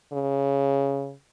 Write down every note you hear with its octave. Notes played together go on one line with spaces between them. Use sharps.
C#3